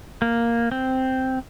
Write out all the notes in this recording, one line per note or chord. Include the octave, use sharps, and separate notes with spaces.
A#3
C4